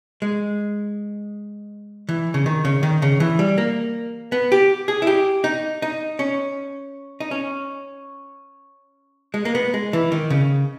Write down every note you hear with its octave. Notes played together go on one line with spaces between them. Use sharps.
G#3
E3
C#3
D#3
C#3
D#3
C#3
E3
G3
A#3
B3
G4
G#4
E4
G4
D#4
D#4
C#4
D#4
C#4
G#3
A#3
B3
G#3
E3
D#3
C#3